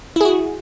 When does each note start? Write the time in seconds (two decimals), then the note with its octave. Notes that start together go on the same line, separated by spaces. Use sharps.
0.16 E4
0.21 G#4
0.25 F#4